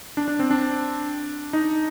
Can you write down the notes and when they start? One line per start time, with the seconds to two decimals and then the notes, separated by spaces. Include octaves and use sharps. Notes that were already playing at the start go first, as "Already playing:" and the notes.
0.17 D4
0.28 D4
0.39 C4
0.51 D4
1.53 D#4